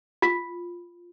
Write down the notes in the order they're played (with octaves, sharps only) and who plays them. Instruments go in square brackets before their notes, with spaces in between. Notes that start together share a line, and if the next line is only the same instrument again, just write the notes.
[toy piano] F4